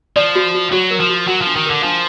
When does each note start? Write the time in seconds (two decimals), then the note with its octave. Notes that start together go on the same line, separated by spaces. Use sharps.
0.16 F3 D5
0.35 F#4
0.54 F#4
0.72 F#3 F#4
0.91 A#4
1.00 F3
1.09 F#4
1.28 F#3 F#4
1.42 F3 D4
1.56 D#3
1.66 D3 A#4
1.83 F3 D4